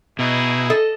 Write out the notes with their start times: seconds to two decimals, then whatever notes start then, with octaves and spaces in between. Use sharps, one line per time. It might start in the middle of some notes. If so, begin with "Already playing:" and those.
0.19 B2 D#4 E4 G#4
0.70 A4 D#5